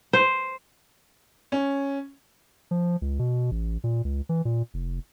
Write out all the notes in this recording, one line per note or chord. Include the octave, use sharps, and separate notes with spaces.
C5
C#4
F3
C#2
B2
A1
A#2
C#2
E3
A#2
F1